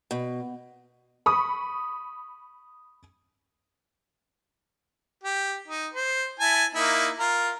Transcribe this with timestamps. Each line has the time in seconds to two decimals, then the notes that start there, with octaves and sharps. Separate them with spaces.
0.11 B2
1.26 B5 C#6 D#6
5.23 G4
5.68 D#4
5.94 C5
6.40 E4 G#5 A5
6.75 A#3 D#4 E4
7.19 F4 A#4